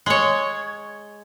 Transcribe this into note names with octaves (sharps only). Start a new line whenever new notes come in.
G#3 C#5